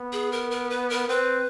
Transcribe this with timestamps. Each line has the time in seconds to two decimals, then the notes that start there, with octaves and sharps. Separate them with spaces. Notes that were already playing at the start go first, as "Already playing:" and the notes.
Already playing: B3
0.13 G#4
0.32 A#4
0.51 A#4
0.70 B4
0.90 A#4
1.08 C4 B4